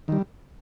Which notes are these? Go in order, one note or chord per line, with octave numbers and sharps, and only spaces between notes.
D#3 G3